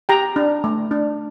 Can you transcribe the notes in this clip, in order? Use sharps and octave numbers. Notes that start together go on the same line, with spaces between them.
G4 G5 A#5
D4
A3
D4